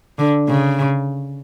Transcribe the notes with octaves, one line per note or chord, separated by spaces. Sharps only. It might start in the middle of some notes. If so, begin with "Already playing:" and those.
D3
C#3